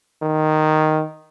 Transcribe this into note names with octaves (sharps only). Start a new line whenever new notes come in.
D#3